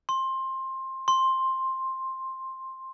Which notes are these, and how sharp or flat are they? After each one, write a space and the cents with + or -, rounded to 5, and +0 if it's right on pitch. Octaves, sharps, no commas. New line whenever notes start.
C6 +20
C6 +10